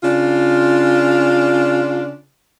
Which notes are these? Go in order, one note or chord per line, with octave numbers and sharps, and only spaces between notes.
C#3 D4 F4